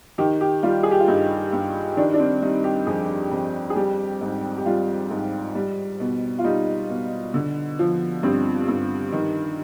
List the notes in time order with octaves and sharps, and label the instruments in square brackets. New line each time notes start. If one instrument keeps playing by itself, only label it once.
[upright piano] D#3 G4
G4
G3 F4
G#4
G4
F4
G2 D#4
G2
D#3 D4
D4
C4
G3 D#4
G4
F2 G#4
F2
G#4
G3 G4
G#2
G4
G3 F4
G#2
G3
B2
F4
G3 D#4
B2
D3
F3
G2 C4
G2
D#3